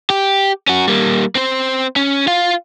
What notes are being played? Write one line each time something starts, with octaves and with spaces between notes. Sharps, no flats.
G4
C#4 F#4
G3 A#3
C4 C5
C#4
F4 F5